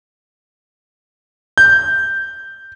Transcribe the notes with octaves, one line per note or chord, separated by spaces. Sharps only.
G6